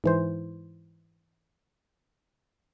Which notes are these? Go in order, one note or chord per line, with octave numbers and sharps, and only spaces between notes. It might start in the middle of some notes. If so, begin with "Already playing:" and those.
G#2 E3 C5